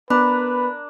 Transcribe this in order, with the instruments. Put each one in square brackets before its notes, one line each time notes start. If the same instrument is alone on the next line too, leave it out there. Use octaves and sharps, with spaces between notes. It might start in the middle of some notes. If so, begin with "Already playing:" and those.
[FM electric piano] B3 [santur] D4 A#4 [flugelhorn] B4 [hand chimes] B5